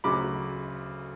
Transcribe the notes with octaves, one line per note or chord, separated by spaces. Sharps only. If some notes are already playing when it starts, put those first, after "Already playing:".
D2 C#3 F#3 B5 D6